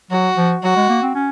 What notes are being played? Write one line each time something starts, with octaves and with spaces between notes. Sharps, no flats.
F#3 F#4
F3
F#3 F#4
G#3
A#3
C4
C#4